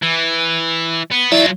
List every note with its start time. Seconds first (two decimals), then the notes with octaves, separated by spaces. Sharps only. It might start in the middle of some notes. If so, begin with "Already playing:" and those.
0.03 E3
1.11 B3
1.32 F#3 E4 F4 D5 E5